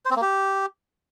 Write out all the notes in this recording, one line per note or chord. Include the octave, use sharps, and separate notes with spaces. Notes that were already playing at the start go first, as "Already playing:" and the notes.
C5
C4
A#3
G4